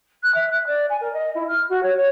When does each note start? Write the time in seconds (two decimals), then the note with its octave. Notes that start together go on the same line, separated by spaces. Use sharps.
0.22 F#6
0.34 E5
0.50 F#6
0.66 D5
0.89 G#5
1.00 A#4
1.13 D#5
1.34 E4
1.47 F6
1.69 F#4
1.82 C#5
1.96 C#5